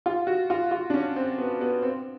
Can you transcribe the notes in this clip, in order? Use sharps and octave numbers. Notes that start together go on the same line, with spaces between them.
F4
F#4
F4
F4
D4
C#4
C4
B3
B3
C4